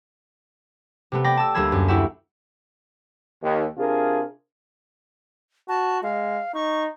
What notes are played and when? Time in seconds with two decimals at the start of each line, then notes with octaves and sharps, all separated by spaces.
1.12 C3 A3 B3
1.24 D5 G5 B5 A#6
1.37 A5 E6
1.54 D2 G3 A#3 B5 E6 G#6
1.72 F#2
1.88 E4 F#4 G4 E5
3.43 D#2
3.78 C3 D4 F4 G#4 A#4
5.68 F#4 A5
6.03 G#3 F5
6.54 D#4 C#6